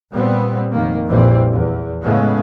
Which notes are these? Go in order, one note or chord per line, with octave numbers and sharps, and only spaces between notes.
A#2 G3 B3 C4
F1 D#3 A#3
A#1 F2 E3 G3 C4
E2
A2 C#3 G#3 A3 B3